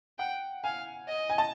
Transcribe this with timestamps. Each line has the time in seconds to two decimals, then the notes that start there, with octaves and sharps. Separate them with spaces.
0.19 F#5 G5
0.64 F5 G#5
1.08 D#5
1.30 G#5
1.38 A5